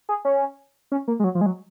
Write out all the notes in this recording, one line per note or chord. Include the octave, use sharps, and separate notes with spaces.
G#4
C#4
C#4
A#3
G#3
F#3
F3
G#3
F#3